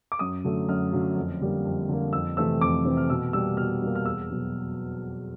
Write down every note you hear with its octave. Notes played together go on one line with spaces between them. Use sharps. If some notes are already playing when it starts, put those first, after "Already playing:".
D6
F#2 D#6
D3 F#3 A3
F#2 F6
D3 F#3 A3
F2
D3 G3 A#3
F2
D3 G3 A#3
F2 E6
C3 E3 A3 C4 E6
F2 D6
C3 E3 A3 C4
F6
B2 E6
G3 A#3 E6
B2 F6
G3 A#3
F6
E2 E6
B2 F#3